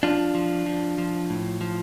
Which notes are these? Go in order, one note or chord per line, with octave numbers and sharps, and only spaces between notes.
F3 D4 F4
F3
F3
F3
A2
F3